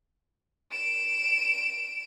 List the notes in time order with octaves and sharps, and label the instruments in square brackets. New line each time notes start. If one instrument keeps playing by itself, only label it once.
[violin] D7 E7